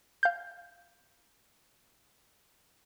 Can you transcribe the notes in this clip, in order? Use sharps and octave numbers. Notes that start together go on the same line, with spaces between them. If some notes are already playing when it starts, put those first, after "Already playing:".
F5 G6